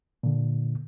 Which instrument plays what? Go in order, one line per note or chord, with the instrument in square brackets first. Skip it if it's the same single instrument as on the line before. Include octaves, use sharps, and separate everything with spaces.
[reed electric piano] A#2 D3